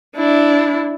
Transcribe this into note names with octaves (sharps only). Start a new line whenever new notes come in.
D4 E4